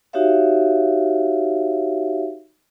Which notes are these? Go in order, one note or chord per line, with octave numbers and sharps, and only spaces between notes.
D#4 F#4 G4 C#5 E5 F5